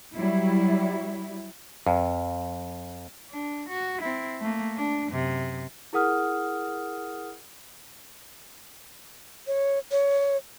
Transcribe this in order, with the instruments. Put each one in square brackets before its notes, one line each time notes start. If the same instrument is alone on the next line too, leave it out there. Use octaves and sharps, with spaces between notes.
[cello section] F#3 G3 E4
[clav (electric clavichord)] F2
[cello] D4
F#4
C4 E4
A3 A#3
D4
F#2 C3
[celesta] E4 G#4 A#4 F#5 D#6 F6
[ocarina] C#5
C#5